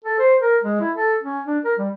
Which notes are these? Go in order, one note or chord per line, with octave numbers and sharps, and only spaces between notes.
A4
C5
A#4
G#3
E4
A4
C#4
D4
A#4
G3